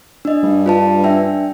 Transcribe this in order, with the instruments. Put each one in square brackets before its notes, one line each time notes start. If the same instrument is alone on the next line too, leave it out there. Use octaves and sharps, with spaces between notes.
[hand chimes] D4 D#5
[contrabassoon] G2
[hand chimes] F4 B4 A5
D4 E5 G5